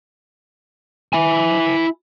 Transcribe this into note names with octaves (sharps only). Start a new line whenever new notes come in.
E4 G#5